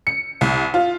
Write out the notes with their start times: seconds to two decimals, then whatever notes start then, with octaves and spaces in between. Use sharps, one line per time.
0.07 C#7
0.41 C2
0.74 F4